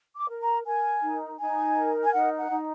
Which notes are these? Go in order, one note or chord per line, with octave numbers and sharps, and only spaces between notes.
D6
A#4
A#5
A#4 G#5
D#4
D#4 G#5
A#4
G#5
D#4 F#5
F#5
D#4